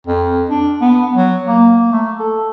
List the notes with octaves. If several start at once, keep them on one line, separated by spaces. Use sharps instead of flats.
F2
D4
B3
F#3
A#3
A3
A4